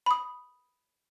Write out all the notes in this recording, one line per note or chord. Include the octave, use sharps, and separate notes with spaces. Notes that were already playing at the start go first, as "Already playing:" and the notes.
B5 D#6